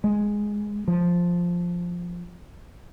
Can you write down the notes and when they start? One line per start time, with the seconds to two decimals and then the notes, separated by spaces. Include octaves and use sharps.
0.04 G#3
0.88 F3